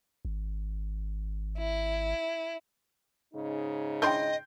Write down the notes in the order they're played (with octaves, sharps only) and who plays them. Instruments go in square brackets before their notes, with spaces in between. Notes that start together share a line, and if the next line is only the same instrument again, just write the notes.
[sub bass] G#1
[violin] E4
[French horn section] G#2 C#3 D#4
[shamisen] C4 D4 E4 [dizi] D#5 [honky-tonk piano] G5 C6 G6